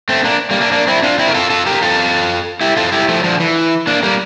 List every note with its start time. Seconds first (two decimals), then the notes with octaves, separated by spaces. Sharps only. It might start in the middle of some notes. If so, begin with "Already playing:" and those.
0.09 A3 C4
0.24 A#3 D4
0.51 G3 A#3
0.61 A#3 D4
0.72 A#3 D4
0.87 C4 E4
1.03 D4 F4
1.18 C4 E4
1.28 A#4
1.34 F4 A4
1.50 F4 A4
1.66 G4 A#4
1.82 F4 A4
2.61 E4 G4
2.77 F4 A4
2.92 E4 G4
3.08 F3 A3
3.24 D3 F3
3.40 E3
3.87 A#3 D4
4.03 G3 A#3